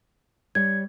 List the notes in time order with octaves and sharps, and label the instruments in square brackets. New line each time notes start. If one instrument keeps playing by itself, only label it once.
[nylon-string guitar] G3 C#5 [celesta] G#6